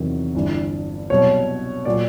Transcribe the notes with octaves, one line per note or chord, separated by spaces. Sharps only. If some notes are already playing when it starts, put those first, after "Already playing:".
Already playing: E2 C3 D#3 F#3
G1 G2 E3
C2 B2 F#3 C#5
A#2 F#3 D5